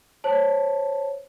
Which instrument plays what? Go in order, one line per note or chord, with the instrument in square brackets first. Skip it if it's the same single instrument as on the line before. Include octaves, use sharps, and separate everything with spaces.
[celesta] C5 C#5 A5